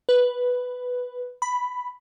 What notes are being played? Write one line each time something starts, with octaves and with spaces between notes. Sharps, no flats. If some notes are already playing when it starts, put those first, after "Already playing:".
B4
B5